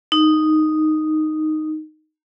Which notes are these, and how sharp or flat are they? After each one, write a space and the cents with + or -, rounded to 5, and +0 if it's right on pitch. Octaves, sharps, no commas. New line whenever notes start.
D#4 -5